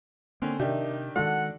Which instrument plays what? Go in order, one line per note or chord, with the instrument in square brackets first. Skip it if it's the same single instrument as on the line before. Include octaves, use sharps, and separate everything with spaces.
[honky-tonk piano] D3 C#4 [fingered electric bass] A#3 [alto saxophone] C4
[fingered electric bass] C3 [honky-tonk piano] D#3 G4 [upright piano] D4 E5 [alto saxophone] D#4
[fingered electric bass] D#3 G#3 [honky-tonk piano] D4 [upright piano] F#4 A4 C6 [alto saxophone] F#5